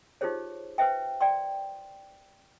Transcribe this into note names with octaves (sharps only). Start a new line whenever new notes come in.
D#4 F4 G4 G#4 C5 C#5
B4 C5 E5 G5
D5 G5 C6